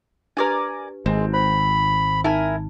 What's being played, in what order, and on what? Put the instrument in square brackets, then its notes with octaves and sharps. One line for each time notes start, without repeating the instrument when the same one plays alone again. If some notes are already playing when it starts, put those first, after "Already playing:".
[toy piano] D4 G4 B4 [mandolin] A#4 D5 G#5
[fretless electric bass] G#1 [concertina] G#3 [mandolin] C4
[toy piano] C5 [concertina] B5
[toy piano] D#4 [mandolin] E4 A#4 G#5